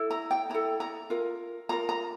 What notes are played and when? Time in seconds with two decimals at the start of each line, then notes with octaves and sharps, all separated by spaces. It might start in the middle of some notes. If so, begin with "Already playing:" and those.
Already playing: E4 A4
0.10 A#5
0.31 G5
0.50 E4 A4 A#5
0.80 A#5
1.10 F4 A#4
1.69 F4 A#4 A#5
1.89 A#5